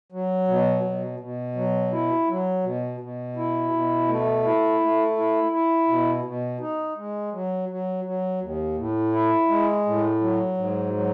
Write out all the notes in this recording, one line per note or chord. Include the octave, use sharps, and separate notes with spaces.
F#3
B2
B2
B2
F#3
E4
F#3
B2
B2
E4
B2
A3
E4
A3
E4
E4
B2
B2
D#4
G#3
F#3
F#3
F#3
D#2
A2
E4
G#3
A2
F#3
G#2
F#3